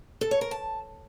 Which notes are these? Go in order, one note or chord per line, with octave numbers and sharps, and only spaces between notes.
A4
C#5
A#4
A5